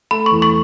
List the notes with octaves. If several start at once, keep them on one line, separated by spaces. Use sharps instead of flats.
A3 B5
E2 C#6
C#6